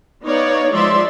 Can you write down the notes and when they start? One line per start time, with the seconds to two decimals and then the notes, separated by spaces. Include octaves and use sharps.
0.23 B3 D#4 C#5 D5 F5
0.72 F3 G#3 D5 E5 C6